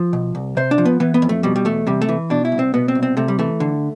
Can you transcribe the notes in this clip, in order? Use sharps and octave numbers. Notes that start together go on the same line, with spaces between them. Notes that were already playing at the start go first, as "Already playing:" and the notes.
Already playing: F3
B2
C2
C3 C5
D4
F3
B3
E3 B3
B3
F2
A3
B2 G3
G3
E2 A3
C3 G3
A3
E3
B2 D4
E4
C2
C4
B2 B3
C4
C2
C4
C3 A3
G3
E3 A3
D3